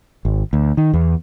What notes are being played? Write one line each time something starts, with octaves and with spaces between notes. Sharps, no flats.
G#1
D2
D#3
E2